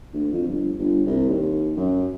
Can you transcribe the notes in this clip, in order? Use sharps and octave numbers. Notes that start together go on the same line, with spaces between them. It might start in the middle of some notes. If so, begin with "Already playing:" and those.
D2
F2
G1
G1
C2
D#2
F#2